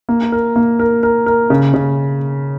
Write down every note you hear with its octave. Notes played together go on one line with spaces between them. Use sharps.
A#3
A#4
A#3
A#4
A#4
A#4
C#3
C#3